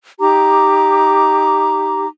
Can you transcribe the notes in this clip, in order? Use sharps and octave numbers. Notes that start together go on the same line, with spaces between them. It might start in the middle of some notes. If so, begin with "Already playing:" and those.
D#4 G4 A#5 D6